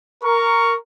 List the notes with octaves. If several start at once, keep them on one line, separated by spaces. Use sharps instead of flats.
A#4 C#6